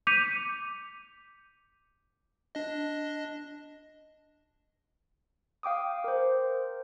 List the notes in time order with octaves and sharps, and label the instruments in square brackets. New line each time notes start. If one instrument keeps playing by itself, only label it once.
[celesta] D6 G6 B6 C#7 D#7 F7
[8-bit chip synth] D4 D#5
[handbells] F5 G5 D6 D#6
A#4 C5